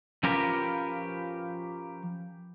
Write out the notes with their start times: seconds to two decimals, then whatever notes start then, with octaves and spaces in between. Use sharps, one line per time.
0.23 F3 C#4 F4 G4 A#4 B4